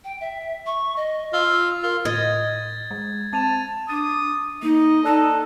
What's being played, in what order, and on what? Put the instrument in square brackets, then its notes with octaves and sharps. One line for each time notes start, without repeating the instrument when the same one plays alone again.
[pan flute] G5
E5
C#6
D#5
[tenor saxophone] F4 [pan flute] E6
[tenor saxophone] F4 [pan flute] A#4
[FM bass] A2 [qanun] D#5 [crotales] G#6 A6
[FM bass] G#3
[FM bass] C4 [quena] A5 [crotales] A6 D#7 F7
[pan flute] D4 [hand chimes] D6 A6 [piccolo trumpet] D#6
[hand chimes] A#3 [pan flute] D#4 [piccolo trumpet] D#5
[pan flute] D#4 [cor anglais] A4 [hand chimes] D5 F#6 A#6